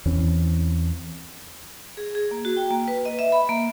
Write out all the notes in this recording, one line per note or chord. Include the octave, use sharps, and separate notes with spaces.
E2 E3 C4 C#4
G#4
G#4
A#3
F#4
G5
A#3
B4
D#5
E5
B5
A#3